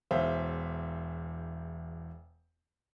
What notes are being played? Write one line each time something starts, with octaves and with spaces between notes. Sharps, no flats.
E1 E2 C5 E5 F5